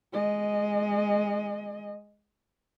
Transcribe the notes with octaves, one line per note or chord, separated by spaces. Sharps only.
G#3 D#5